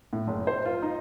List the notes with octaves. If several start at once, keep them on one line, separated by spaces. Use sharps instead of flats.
A2
F#1
C5
F4
D#4